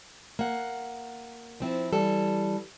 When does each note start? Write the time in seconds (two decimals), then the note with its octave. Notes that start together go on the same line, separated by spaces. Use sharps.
0.39 A#3 F#5
1.60 F3 C4 E4
1.93 E3 G3 A4